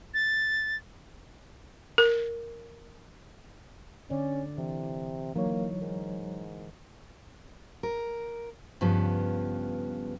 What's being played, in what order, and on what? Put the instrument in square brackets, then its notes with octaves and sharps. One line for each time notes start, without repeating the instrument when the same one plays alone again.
[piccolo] A6
[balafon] A#4
[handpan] D3 D5 [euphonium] C#4
[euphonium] C3 [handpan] E3
[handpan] E3 D#4 [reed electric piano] F#3 C#5 [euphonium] A#3
[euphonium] G#2 [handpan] A#4
[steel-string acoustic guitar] A#4
G2 C#3 F3 B3